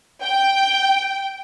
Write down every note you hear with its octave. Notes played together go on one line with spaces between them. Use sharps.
G5